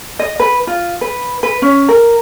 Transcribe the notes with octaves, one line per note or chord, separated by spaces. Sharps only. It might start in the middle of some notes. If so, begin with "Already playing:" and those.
D#5
B4
F4
B4
B4
C#4
A#4